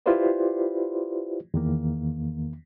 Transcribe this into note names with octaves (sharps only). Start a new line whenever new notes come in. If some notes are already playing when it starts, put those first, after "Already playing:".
E4 F4 G4 B4 C5 D5
E2 D#3 A#3